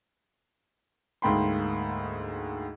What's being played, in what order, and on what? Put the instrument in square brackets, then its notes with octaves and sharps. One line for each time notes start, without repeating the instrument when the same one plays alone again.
[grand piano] D2 G#2 A#3 G5 B5 C6